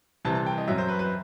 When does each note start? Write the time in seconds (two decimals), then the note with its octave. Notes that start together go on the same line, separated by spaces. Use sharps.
0.25 C2 C3 E3 A5
0.35 A5
0.46 G5
0.58 D#5
0.68 F#2 F#3 E5
0.78 C5
0.89 B4
0.99 B4